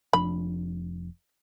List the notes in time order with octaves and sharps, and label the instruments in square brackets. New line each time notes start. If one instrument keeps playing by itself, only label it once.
[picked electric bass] F1 F3 D4 [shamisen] B5